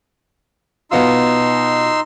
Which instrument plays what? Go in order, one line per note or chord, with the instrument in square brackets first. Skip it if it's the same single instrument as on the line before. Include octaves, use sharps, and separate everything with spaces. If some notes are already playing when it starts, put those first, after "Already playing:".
[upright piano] B2 B3 F4 [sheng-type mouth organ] D#4 C6 E6